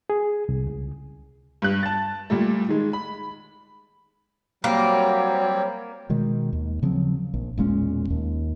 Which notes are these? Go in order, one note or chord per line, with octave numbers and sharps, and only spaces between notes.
G#4
C2
C#2
G2 F#6
A5 A6
A#2 G3 A3
D#3 G#3
B5
F#3 G3 A#3 C4 G4 C5 C#5
B2 D#3 G#3
D#2
C#3 F3 F#3 C4
A#1
E1 A#2 G#3 C#4
D#2